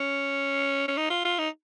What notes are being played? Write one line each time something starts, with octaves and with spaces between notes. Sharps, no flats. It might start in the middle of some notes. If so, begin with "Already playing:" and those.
Already playing: C#4
C#4
D#4
F4
F4
D#4